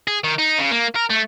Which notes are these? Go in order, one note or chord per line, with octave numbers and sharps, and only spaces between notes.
G#4
D#3
D#4
C#3
A#3
A#4
A3